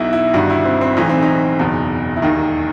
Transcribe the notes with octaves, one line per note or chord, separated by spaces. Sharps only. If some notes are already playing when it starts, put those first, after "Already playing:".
Already playing: B1 B2 D#4 E4
E4
G1 G2 D#3 F#4
E4
C4
C4
B1 A2 E3 D#4
C4
D#4
F#1 E2 B2
E4
E1 D#2 D#3 D#4